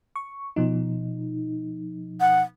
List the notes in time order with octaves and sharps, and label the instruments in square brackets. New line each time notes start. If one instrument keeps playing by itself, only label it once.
[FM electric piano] C#6
B2 F3 D#4
[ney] F#5